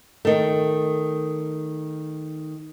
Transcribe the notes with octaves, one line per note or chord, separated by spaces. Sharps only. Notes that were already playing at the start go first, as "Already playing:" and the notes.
D#3 A3